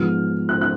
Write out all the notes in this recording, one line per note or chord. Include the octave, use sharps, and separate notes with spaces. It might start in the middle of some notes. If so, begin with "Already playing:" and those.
Already playing: G#2 F3 B3 F6
F#6
F#6